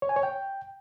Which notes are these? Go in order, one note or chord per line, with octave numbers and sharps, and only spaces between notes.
C#5
G#5
C#5
G5